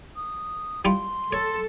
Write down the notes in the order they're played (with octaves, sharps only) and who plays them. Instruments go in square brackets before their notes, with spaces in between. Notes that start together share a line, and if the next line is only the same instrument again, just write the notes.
[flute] D#6
[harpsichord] G3 E4 F4 [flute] C6
[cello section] A4 [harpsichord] C#5